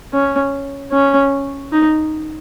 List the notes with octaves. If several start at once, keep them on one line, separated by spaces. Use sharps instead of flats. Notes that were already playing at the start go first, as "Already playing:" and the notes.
C#4
C#4
D#4